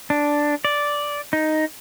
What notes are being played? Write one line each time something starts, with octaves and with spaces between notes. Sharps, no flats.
D4
D5
D#4